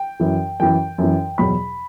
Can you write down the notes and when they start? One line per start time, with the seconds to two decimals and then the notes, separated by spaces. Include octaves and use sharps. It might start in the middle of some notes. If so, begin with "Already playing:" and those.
Already playing: G5
0.20 F#2 E3
0.60 F#2 E3 G5
0.98 F#2 E3
1.38 E2 B2 F#3 B5